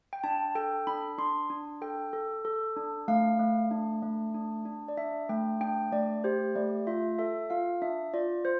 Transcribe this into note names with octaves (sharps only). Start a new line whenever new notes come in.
G5
D4 A5
A4 G5
D4 B5
D4 C6
D4
A4 G5
A4
A4
D4
A3 F5
A3
D4
A3
D4
D4
D5
D4 E5
A3 G5
D4 G5
A3 D5
G4 C5
A3 D5
F4 E5
A4 E5
F4 F5
D4 E5
F4 D5
C5